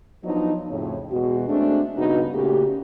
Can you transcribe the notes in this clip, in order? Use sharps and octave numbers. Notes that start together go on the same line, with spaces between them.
F3 F#3 B3 D4 D#4
F2 A2 C#3 C#4
E2 B2 G#3 F#4
G#3 A3 C4 D4
G2 C#3 B3 D#4 F#4
A#2 C#3 A3 C#4 F#4 G4